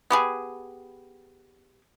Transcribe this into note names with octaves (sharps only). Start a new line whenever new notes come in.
B3 G4 G#4